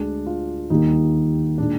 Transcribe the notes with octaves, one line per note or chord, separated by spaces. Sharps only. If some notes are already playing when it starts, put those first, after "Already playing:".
Already playing: D2 D3 G#3 D4
F4
D#2 D#3 G3 A#3 D#4
A#2 G#3 D4